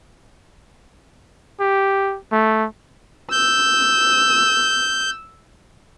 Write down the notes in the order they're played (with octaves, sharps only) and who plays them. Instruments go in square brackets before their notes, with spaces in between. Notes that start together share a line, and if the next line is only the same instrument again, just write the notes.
[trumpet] G4
A3
[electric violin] E6 [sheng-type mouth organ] G6